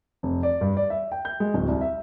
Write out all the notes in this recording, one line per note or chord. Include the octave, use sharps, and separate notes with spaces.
F1
D5
G2
D5
E5
G5
G6
G#3
D1
C2
E5